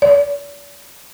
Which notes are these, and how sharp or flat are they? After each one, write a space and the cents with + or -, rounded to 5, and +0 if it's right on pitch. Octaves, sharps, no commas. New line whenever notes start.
D5 -45